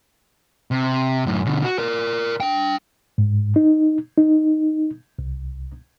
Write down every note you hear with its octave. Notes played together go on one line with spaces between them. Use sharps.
C3
F#2 A2
B2 D3
F#4
A#4 D5
D4 G5
G#2
D#4
D#4
C2